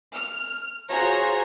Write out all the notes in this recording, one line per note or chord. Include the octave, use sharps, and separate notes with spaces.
F6
F4 F#4 G#4 C5 C#5 A#5